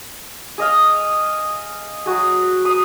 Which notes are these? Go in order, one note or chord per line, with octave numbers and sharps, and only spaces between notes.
G#4 D#5 F5
F#3 F#4 G#4
D#6